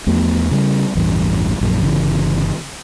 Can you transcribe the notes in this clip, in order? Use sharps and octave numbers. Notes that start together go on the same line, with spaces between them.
E2 F3 A3 B3
C#3 G3
A1 E2 G2
A#1 F#2
G1 C#3 E3